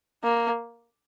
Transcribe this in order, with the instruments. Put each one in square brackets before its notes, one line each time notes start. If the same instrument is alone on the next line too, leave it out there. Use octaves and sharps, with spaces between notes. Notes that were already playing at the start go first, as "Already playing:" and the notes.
[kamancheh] A#3